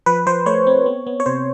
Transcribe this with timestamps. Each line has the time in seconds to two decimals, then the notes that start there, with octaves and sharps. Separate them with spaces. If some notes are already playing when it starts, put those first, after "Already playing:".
0.06 F3 B4
0.26 F3 C5
0.46 A3 C#5
0.67 C4
0.86 B3
1.07 B3
1.20 C#5
1.26 C3 C5